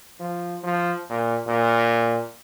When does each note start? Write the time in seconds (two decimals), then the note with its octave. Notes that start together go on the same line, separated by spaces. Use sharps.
0.20 F3
0.64 F3
1.09 A#2
1.47 A#2